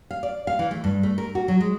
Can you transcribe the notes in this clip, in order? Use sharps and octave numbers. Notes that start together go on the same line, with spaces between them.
F5
D5
F5
E3
A3
G2
A3
A#4
F#4
F#3
G#3